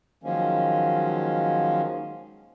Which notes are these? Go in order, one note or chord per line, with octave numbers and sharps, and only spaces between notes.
D#3 F3 F#3 G#3 A#3 C#4